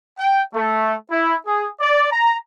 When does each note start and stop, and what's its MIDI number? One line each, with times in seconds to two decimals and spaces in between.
0.19 0.41 79
0.54 0.93 57
1.11 1.36 64
1.46 1.67 68
1.80 2.07 74
2.11 2.37 82